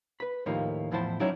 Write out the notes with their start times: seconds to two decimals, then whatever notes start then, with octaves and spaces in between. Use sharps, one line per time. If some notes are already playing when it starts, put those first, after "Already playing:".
0.20 B4 B5
0.46 D#2 A2 F3 A#3 D#4
0.92 E2 A2 F3 E4 C5 A5
1.20 F#3 C#4 D#4 E4 D5